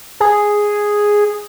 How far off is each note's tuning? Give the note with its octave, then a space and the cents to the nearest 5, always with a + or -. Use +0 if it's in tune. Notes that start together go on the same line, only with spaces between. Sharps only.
G#4 +0